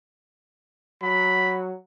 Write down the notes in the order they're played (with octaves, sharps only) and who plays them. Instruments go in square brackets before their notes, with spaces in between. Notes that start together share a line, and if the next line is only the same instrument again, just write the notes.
[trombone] F#3 [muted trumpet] B5